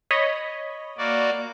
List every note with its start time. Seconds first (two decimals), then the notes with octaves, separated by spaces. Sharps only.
0.11 C#5 D#5 B5
0.98 A#3 F#4 D5